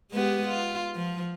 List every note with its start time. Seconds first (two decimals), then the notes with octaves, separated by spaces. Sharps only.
0.12 G#3 B3 G4
0.47 F4
0.96 F3